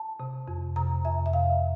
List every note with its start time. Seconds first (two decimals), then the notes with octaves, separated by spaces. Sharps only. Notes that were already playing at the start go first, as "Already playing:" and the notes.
Already playing: A5
0.20 C3
0.48 F2
0.76 C3 A#5
1.05 F2 E5
1.26 E5
1.33 C3 F5